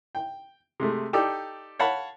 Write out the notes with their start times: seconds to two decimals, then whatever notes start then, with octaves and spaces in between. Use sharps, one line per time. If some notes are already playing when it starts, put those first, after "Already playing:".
0.15 G5
0.80 C3 G#3 A3
1.13 D#4 G4 A4 D5
1.79 C#5 F5 F#5 A5 B5